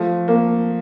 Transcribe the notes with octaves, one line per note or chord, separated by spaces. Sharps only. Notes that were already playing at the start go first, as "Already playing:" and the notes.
Already playing: F3 A3
A#3